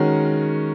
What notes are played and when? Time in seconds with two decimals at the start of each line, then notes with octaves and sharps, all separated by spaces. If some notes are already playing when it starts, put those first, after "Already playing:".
Already playing: D#3 G#3 C#4 F#4 A#4